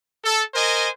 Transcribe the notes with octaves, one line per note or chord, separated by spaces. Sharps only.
A4
A#4 C5 D#5 G#5